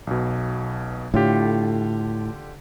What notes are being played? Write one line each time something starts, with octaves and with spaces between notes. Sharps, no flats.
B1 B2
A2 D3 F4 G4